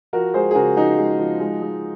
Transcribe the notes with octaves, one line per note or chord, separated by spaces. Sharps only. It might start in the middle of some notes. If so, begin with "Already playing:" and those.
F3 F#4 A#4
G#3 G#4 C5
G#4
C#3 F#4 A#4
F3 D#4 F#4
G#3
F3
G#3
G#3